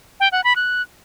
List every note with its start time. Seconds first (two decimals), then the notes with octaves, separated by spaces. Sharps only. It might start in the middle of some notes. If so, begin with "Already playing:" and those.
0.20 G5
0.32 F#5
0.44 B5
0.56 F#6